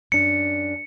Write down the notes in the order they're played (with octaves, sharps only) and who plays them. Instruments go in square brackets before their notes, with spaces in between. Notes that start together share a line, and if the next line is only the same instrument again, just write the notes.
[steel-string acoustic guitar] F#2 D4 [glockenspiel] C#7